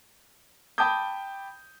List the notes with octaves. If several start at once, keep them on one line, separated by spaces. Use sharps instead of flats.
G5 A5 B5 D6 D#6 G6